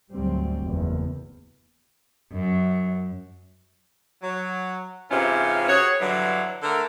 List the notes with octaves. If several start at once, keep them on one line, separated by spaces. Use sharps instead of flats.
D2 G#2 F#3 G3 C4
F#1 E2
F#2
F#3
G#2 C3 E3 C#4 F4
F#4 G#4 C#5
G2 D3 E3 F#3
D3 A3 A4 A#4